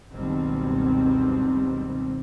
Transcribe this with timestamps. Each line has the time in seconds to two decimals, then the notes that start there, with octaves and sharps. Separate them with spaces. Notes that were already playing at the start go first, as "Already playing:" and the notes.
0.12 F#1 C#2 B2 D#3 G3 C4